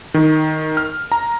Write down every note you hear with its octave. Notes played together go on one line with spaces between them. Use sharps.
D#3
F6
A#5